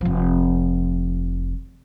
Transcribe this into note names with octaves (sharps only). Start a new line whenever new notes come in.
F1 F3